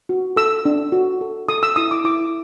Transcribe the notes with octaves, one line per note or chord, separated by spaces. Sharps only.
F#4
A4 E6
D4
F#4
A4
A4 D#6
E6
E4 D#6
D6
E4 D6